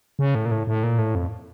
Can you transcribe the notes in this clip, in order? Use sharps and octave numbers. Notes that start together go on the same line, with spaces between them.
C#3
A2
A#2
A2
A2
A#2
A2
F2